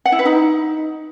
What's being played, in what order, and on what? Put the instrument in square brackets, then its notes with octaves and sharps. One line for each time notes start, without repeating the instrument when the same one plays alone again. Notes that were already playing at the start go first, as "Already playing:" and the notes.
[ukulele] F#5
E4
B4
D#4